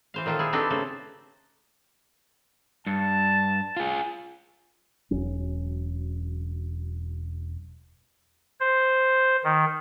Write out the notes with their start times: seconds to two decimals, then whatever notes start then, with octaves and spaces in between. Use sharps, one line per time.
0.14 E3 C5 F5
0.26 A#2 D#3 F4 A4 C5
0.39 E4 G#4
0.53 C4 D4 D#4 G4 A4 B4
0.70 C#3 A3 A4 C5
2.87 G2 A5
3.77 F4 G#4
5.11 E1 F#3 C#4
8.61 C5
9.44 D#3